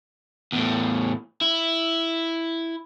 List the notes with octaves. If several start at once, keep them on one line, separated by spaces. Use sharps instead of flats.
E2 A2
E4